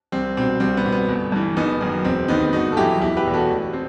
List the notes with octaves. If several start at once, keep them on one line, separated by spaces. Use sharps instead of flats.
C2 C4
B2 C4
C2 C4
B3
B2
B3
G1
G2 E3
F#1 B3 D#4
F#2 D#3
E1 C4
D#2 D#3 B3 D#4
G1 D#4 F#4
A4
F#2 E3 E4 G4
E1 E4 G4
G4 B4
E2 B2
F#4 A4
A1
C4